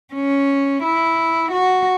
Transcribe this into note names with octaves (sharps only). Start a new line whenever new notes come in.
C#4
E4
F#4